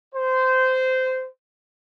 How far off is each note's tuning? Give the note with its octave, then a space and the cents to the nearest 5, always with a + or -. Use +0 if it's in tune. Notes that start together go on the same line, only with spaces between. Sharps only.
C5 -15